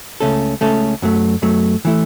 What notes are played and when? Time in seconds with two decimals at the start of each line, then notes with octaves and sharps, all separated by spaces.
0.20 C#2 C#3 A3 C#4 A4
0.61 C#2 C#3 A3 C#4 A4
1.02 F#2 F#3 A3
1.42 F#2 F#3 A3
1.85 E3 A3 E4